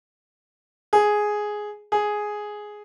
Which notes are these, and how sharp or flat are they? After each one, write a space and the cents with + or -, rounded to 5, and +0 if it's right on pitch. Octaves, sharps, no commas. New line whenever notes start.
G#4 +5
G#4 +5